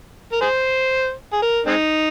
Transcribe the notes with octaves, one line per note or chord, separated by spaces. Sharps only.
A#4
G#4 C5
G#4
A#4
G#3 C4 D#4